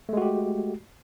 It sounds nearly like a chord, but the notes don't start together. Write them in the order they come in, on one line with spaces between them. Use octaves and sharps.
A3 G#3 F#4 G4